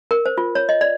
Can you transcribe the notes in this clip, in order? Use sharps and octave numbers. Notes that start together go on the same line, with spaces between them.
A#4
C5
F4
C#5
D#5
D5